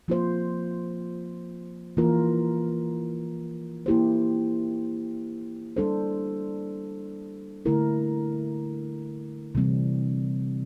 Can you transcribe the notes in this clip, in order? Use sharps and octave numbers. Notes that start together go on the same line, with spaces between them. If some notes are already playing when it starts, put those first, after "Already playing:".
F3 A#3 F4 C5
E3 A#3 F4 A#4
A#3 E4 G4 C5
G3 D4 A4 C5
D3 A3 E4 A#4
C3 E3 G3 C4